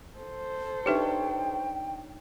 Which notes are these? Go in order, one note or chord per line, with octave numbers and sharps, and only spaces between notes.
A4 C5
D4 D#4 G4 B4 C#5 E5 G5